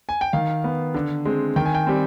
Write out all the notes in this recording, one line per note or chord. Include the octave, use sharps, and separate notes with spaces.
G#5
G5
D#3 F5
B3
D3
G#3 C4
D#3 G5
G#5
G5
G3 C4